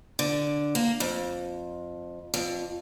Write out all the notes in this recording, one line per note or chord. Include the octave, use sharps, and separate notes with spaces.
D3
A#3
F2
F2